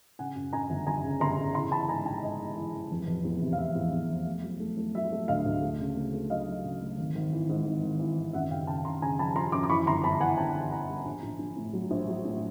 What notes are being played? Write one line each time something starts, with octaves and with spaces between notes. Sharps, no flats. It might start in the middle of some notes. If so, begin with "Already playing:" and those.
C#3 F#5 G#5
F#2
F#2 G#5 A#5
G1
G1 G#5 A#5
C#3
G1 A#5 C6
C#3
E3 A#5 C6
E3 A5 B5
G#2 G#5 A#5
A#1 G5 A5
G#2 D#5
E3
E3
E3
F1
F1
E2
C3
F5
F1 E5
E2
E2
F1
A3
F#3
A3
A3
F#3 E5
A3
D2 D#5 F5
D2
A3
C#3
A3
A3
F#3 D#5 F5
F#3
C#3
A3
G#1
G#1
E3
G#2
G#1
G#1
E3
G#1
F#2 E5 F#5
C#3 F5 G5
C#3 G5 A5
C#3 A#5 C6
C#3 G#5 A#5
F3 A5 B5
F3 A#5 C6
F#2 C6 D6
D6
E3 B5 C#6
G1 A#5 C6
G1 A5 B5
E3 F#5 G#5
G1 G5 A5
E3
E3 G#5 A#5
G3
A#1
A#1
A#1
A2
F#3
A#1
F#3
A2